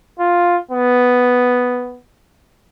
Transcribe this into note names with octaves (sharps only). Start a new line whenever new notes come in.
F4
B3